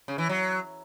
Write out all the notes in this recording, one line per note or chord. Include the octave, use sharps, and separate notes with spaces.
C#3
E3
F#3